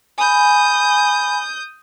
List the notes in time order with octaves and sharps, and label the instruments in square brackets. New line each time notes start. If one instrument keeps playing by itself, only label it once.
[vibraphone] G#5 B5 [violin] D#6 G6